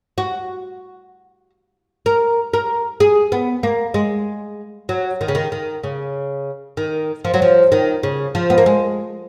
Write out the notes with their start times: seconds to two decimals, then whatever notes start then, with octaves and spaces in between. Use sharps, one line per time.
0.18 F#4
2.06 A#4
2.54 A#4
3.00 G#4
3.32 B3
3.63 A#3
3.94 G#3
4.89 F#3
5.21 D#3
5.28 C#3
5.35 D#3
5.52 D#3
5.84 C#3
6.77 D#3
7.25 F3
7.34 F#3
7.42 F3
7.72 D#3
8.03 C#3
8.35 F3
8.50 B3
8.58 A#3
8.66 G#3